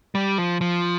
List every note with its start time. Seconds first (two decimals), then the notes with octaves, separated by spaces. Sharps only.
0.15 G3
0.38 F3
0.61 F3